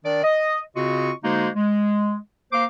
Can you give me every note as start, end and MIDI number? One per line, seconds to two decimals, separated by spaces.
0.04 0.23 51
0.04 0.23 62
0.04 0.23 74
0.24 0.60 75
0.75 1.11 49
0.75 1.11 60
0.75 1.11 65
0.75 1.11 66
0.75 1.11 75
0.75 1.11 85
1.23 1.49 50
1.23 1.49 56
1.23 1.49 58
1.23 1.49 63
1.23 1.49 66
1.23 1.49 72
1.55 2.16 56
2.52 2.65 58
2.52 2.65 72
2.52 2.65 77
2.52 2.65 86